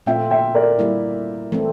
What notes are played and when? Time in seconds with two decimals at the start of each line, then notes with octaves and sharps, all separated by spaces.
0.06 A#2 A3 C4 F4 E5 G5
0.31 E5 G5
0.55 A#4 D5
0.79 G3 A#3 E4
1.52 E3 A3 C4